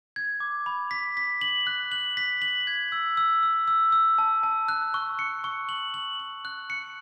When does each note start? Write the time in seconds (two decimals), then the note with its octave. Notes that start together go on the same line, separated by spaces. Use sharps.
0.16 G#6
0.40 D6
0.66 B5
0.91 B6
1.17 B6
1.41 F#7
1.67 F#6
1.92 F#7
2.17 B6
2.42 F#7
2.67 G#6
2.92 E6
3.17 E6
3.43 E6
3.68 E6
3.92 E6
4.18 A5
4.43 A5
4.68 F#6
4.94 C#6
5.19 C#7
5.44 C#6
5.69 F#7
5.94 F#7
6.20 F#7
6.45 F#6
6.70 C#7